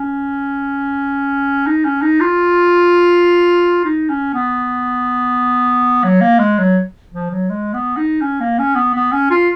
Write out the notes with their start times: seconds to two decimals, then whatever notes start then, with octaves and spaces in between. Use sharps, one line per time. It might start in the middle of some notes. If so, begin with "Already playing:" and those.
Already playing: C#4
1.67 D#4
1.85 C#4
2.02 D#4
2.20 F4
3.85 D#4
4.10 C#4
4.34 B3
6.04 F#3
6.21 A#3
6.39 G#3
6.58 F#3
7.12 F3
7.30 F#3
7.49 G#3
7.74 B3
7.97 D#4
8.21 C#4
8.41 A#3
8.59 C#4
8.76 B3
8.94 B3
9.13 C#4
9.31 F4